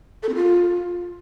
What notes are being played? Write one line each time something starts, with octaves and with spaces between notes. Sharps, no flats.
A4
C4
F4